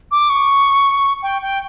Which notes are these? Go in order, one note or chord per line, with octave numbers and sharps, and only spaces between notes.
D6
C#6
G5
G5